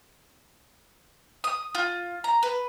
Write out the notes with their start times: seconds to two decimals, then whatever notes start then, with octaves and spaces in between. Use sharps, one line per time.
1.44 D#6
1.75 F4
2.24 A#5
2.43 B4